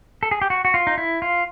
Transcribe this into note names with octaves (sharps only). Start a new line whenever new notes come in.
A4
G#4
G4
F#4
F#4
F4
D#4
E4
F4